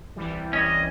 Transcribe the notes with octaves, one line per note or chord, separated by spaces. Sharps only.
C2 E3 G3
C#4 D#5